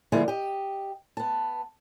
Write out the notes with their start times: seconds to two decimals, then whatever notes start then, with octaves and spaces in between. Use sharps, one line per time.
0.12 D3 F3 G3 A#3 E4 G#4
0.28 G4 D#5
1.17 B3 A5